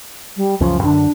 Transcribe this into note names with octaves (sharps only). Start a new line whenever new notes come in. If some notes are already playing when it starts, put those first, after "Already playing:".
G3
C#2 F#2 F3 C#4
F#2 D3 D4